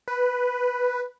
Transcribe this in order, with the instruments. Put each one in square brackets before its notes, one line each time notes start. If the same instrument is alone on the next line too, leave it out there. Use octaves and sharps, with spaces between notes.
[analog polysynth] B4